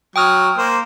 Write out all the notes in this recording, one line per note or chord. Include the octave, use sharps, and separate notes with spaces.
F#3 G5 D#6 F6
A#3 C5